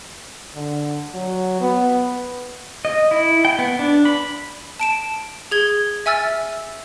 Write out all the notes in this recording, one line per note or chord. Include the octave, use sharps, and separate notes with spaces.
D3
F#3
B3
D#5
E4
G5
B3
D4
B5
A5 D7 E7
G#4 G#6 G7
E5 G#5 E6 F6 A6